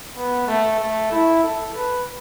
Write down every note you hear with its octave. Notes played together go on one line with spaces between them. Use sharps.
B3
A3
A3
E4
A4
B4